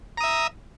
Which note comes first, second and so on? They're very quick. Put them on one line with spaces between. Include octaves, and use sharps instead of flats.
A#5 D#6 E5